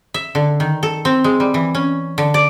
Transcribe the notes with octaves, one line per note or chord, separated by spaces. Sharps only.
E5
D3
D#3
A4
C4
G#3
G3
E3
C#4
D3
D5